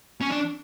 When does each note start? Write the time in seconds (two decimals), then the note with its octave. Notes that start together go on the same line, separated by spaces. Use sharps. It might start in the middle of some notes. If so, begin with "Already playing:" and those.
0.22 C#4
0.32 D4